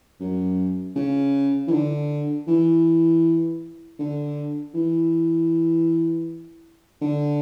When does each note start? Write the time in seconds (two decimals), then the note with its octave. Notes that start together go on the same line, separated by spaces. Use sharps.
0.20 F#2
0.96 C#3
1.67 E3
1.71 D3
2.47 E3
3.99 D3
4.74 E3
7.01 D3